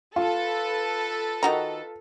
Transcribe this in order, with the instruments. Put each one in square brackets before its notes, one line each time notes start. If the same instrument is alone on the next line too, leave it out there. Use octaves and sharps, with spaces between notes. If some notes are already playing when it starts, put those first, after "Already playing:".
[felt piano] F4 [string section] A4 B4
[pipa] D#3 F#4 A#5